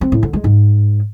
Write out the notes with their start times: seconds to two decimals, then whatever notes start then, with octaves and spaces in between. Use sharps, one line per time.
0.01 C4
0.12 A2
0.23 D3
0.33 G#3
0.44 G#2